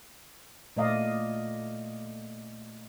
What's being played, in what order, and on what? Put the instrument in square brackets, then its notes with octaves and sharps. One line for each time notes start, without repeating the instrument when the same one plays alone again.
[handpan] A#2 A3 D5 D#5 F5